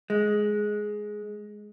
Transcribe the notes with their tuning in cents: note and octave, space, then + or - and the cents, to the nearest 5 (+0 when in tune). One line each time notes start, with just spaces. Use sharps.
G#3 +10